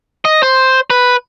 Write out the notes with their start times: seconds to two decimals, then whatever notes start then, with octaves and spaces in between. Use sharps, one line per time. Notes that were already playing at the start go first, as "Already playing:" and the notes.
0.25 D#5
0.43 C5
0.90 B4